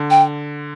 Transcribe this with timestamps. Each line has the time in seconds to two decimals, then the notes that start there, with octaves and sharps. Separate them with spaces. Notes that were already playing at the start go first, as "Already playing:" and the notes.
Already playing: D3
0.10 G5